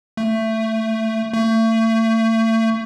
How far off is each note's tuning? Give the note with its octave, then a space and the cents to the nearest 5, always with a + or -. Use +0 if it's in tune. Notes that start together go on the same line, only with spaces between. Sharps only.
A3 +15
A3 +35